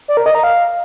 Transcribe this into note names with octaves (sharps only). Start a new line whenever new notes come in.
D5
A#4
D#5
A#5
F5